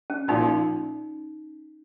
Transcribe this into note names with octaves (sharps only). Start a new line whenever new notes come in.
C#4
A#1 A#2 F3 D#4